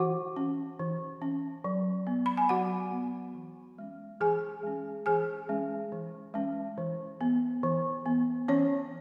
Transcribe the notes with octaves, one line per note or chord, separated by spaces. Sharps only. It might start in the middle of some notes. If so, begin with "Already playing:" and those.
Already playing: E3 F#4 F#5
C#4
E3
C#4
F#3
B3
B5
G#5
F#3 F#4 F#5
B3
E3
G#3 C#4
E3 G#4 G#5
G#3 C#4
E3 G#4 G#5
G#3 C#4
E3
G#3 C#4
E3
B3
E3
B3
E3 C#4 C#5